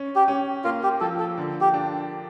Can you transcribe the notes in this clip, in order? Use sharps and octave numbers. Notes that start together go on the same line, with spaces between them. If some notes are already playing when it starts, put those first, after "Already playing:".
Already playing: C#4
G4
C#4
A#3 F4
G4
F3 A4
A4
D3
G4
D4